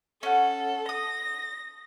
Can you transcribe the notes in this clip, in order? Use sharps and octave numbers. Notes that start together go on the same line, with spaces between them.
C#4 A4 F#5
D#6 A#6